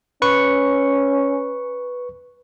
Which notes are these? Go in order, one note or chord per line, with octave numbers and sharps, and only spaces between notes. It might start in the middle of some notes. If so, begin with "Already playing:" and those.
C#4 B4 C#6 C#7